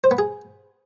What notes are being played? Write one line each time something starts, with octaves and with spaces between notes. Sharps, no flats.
C5
B3
G#4